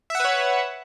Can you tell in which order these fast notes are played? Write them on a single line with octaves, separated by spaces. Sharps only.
E5 F#5 B4 C#5